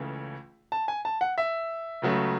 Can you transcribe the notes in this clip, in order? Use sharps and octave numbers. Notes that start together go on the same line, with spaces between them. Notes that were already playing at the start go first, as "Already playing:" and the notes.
Already playing: C#2 C#3 E3 A3
A5
G#5
A5
F#5
E5
C#2 C#3 F#3 A3